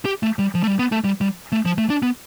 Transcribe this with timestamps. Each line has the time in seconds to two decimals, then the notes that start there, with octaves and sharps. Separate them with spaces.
0.05 G4
0.23 A3
0.39 G3
0.55 F3
0.64 A3
0.67 G3
0.79 B3
0.92 A3
1.04 G3
1.21 G3
1.52 A3
1.65 F3
1.78 A3
1.90 D4
2.03 B3